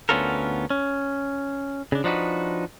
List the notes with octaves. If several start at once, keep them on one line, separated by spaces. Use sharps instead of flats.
D2 B3 C#4 F4 A4 A#4
C#4
C#3 D4
F3 D4 D#4 F#4 B4